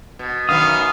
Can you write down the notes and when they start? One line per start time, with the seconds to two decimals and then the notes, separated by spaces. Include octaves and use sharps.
0.19 B2
0.49 F#2 D#3 B3 F5 D#6